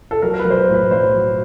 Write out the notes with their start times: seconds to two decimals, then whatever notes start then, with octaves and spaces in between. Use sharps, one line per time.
0.11 A4
0.22 F#3 A#4
0.34 A#4
0.39 B4
0.45 B1
0.50 C5
0.57 B4
0.68 A2
0.74 B4
0.91 B1 C5
1.14 F#3